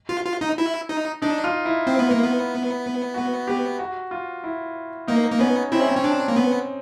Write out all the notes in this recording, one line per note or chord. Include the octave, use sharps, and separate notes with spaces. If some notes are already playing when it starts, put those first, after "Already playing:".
F4
F4
D#4
E4
D#4
D4 D#4
F4
E4
C4
B3
A#3
B3
F#4
G4
F#4
F4
E4
A#3 D#4
A#3
B3 C#4
C4 E4
C#4
C4
C#4
D4
A#3
B3